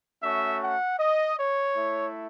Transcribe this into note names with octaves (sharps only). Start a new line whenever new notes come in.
A3 C#4 F#4 E5
F#5
D#5
C#5
A3 E4